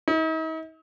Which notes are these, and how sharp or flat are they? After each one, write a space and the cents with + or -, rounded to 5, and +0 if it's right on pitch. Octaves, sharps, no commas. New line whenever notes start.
D#4 +45